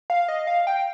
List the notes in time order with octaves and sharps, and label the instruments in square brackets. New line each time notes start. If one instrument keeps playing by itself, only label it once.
[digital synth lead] F5
D#5
F5
G5